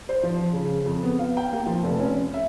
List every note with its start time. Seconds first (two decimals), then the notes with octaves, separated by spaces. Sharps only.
0.09 C5
0.23 F3
0.53 C#3
0.86 F2
1.03 B3
1.19 F5
1.37 G5
1.53 A#3
1.66 F3
1.84 F1
2.00 C#4
2.34 E5